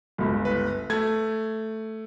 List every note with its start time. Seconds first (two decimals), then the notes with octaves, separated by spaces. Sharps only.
0.18 G1 C#2
0.45 B4
0.90 A3 G#6